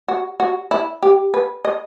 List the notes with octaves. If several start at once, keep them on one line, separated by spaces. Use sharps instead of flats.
F#4
F#4
E4
G4
B4
D#5